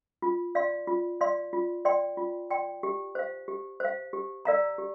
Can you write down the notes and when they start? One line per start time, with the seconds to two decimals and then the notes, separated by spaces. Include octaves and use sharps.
0.22 F4
0.55 D5 F5 C6
0.87 F4
1.21 D5 F5 C6
1.53 F4
1.85 D5 G5 C6
2.17 F4
2.50 D5 G5 C6
2.83 G4
3.15 C5 F5
3.48 G4
3.80 C5 F5
4.13 G4
4.45 A#4 D5 F5 A#5
4.78 G4